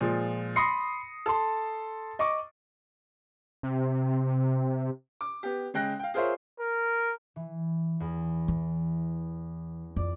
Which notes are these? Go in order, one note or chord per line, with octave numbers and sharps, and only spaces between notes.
A#2 F3 G#3
B5 C6 D#6 A#6 C7 C#7
A4 A5 C6
D#5 C#6 D6
C3
D6
B3 G4
C#3 G#3 G5 F#6 A#6
F5 G5
F4 G#4 A#4 C5 C#5 E5
A#4
E3
E2
E3
F2 D5